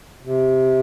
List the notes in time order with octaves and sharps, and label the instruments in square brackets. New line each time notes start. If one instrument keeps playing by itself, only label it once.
[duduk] C3